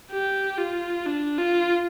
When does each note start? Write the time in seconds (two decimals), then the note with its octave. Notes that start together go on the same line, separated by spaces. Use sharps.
0.12 G4
0.58 F4
1.06 D4
1.38 F4